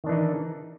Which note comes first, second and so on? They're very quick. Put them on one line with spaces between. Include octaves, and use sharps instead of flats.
D#3 D4 E3 D#4